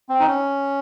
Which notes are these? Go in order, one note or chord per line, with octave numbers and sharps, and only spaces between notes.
C4
D#4
C#4